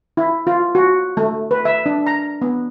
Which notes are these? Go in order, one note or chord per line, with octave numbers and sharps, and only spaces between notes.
E4
F4
F#4
A3
B4
E5
D4
A#5
B3